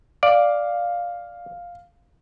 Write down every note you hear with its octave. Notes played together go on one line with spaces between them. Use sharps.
D5 F5